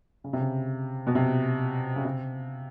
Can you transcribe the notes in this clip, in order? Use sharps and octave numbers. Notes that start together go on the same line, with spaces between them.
C#3
C3
C#3
B2
C3
C#3
C3